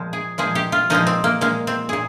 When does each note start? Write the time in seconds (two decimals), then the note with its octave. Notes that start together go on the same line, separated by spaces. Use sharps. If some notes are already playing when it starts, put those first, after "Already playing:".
Already playing: A#2 F3 G#3
0.13 G#4
0.38 A#2 F3 G#3 G#4
0.55 G4
0.72 F4
0.90 A#2 F3 G#3 D#4
1.07 C4
1.24 A#3
1.41 A#2 G#3 A#3
1.67 C4
1.89 A#2 G#4